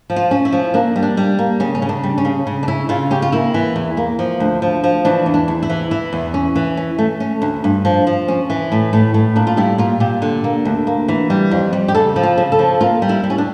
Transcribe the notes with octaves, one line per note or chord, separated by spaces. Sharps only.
F3
F4
C#4
E4
F3
A#3 D4
G3
D4
G3
A#3
C#3 C#4
C#4
C#3
D4
G3
C#4
C#3
C#3
D4
C#4 E4
C#3 F4
C#4 G4
F4
A#3 E4
E3
E2
A#3
F3
D2
F3
F3
E3 D4
E2
D4
E2
E4
E3
E3 E4
E2
C#4
E3
C#4
A3
C#4
D2
G2
F3
F3
C#4
E3
A2
A2
A2
A#2 D4
F4
G3 E4
A#2 F4
A#2 G4
D3
A#3
D2
A#3
E3
G3
F2
G3
G4
C#3 A4
F3
F4
C#3
A4
F3
A#3 F4
G3
E4
G3
C#4
D4